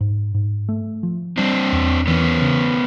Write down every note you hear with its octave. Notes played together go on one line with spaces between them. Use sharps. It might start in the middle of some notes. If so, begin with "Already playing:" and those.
G#2
G#2
A3
F3
G3 C4 D4
E2
E3 B3 C#4
C#3